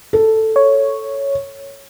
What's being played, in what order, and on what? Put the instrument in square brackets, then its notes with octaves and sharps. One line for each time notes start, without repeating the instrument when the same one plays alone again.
[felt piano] A4
[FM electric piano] C#5